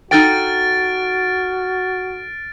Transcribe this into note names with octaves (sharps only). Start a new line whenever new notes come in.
D#4 F#4 A4 G5 F6 A6 D7